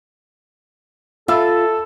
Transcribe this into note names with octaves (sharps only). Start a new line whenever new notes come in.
F4 A4 E5 B5 E6